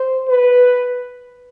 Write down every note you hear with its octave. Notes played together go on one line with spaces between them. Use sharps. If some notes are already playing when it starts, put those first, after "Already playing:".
Already playing: C5
B4